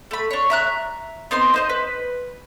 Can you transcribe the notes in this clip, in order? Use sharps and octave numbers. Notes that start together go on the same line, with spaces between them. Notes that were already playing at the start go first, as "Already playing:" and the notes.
A3 B5
D4 C#5
E5 A#5 F#6
B3 C4 D#4 C6
D#4 C5 D#5
B4